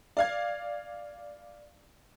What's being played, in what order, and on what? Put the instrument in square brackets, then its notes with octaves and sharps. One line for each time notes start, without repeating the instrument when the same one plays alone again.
[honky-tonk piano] D5 F5 G#6